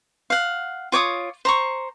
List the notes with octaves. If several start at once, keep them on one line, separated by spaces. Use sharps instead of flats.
F5 F#5
F4 C#5 D6 D#6
C5 A#5 C#6